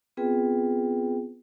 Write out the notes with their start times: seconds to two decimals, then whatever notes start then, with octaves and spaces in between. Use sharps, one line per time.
0.17 B3 C4 F4 G#4 B4 G5